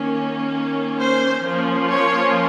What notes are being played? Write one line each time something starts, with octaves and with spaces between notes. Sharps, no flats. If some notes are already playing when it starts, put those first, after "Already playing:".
Already playing: D#3 A#3 C#4
C5
F3 A#3 C#4
C#5